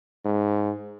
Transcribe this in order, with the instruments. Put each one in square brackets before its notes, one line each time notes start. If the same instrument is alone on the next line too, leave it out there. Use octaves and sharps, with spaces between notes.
[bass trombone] G#2